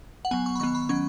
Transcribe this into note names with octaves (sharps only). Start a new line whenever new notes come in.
F#5
F#3 B3 G#5
C#6
B5
D#3 B3 C#6
B5
D#3 F#3 C#4 C#6